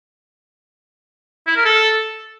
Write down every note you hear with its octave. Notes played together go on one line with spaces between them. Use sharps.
E4
A#4
A4